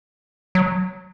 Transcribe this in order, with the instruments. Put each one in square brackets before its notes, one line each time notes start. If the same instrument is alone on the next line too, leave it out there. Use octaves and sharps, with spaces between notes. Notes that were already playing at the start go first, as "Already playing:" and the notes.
[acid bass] F#3